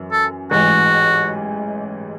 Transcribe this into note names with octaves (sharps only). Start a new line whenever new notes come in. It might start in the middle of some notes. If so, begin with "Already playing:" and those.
Already playing: F#2 E3
A4
A1 G#2 E3 F#4